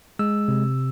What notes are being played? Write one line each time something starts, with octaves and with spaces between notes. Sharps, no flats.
G#3 E6
C3